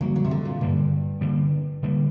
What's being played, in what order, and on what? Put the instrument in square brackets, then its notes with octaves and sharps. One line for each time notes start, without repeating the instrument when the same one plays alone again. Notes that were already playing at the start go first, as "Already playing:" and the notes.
[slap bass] D3 G3 A#3 [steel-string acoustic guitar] F#3
[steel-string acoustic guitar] F#3
C3
D3
A#2
[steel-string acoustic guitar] G2 [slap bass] D3 G3 A#3
[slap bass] D3 G3 A#3
D3 G3 A#3